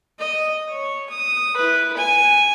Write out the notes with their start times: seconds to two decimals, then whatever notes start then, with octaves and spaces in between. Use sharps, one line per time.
0.19 D#5
0.69 C#5
1.10 D#6
1.56 E4 B4
1.97 G#5